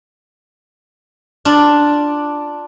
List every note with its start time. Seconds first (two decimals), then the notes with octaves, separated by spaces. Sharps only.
1.45 D4 F4 D5